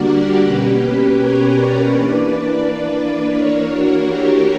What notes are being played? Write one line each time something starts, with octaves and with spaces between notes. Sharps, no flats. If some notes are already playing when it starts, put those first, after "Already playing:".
Already playing: D3 G3 A#3 D4 F#4 A#4 D5 F#5
G4
B2 A#3 C#4 G4 B4
A#4 C#5
B4 D5
E3 A#3 D4 B4 D5
E3 A#3 D4 A#4 C#5
F#4
G4